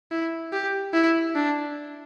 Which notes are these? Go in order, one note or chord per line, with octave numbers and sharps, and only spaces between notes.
E4
G4
E4
D4